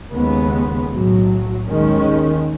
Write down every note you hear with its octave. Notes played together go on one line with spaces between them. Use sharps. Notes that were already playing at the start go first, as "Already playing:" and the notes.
D#2 C#3 G#3 B3
B1 A2 F#3
D#2 D#3 G#3 C#4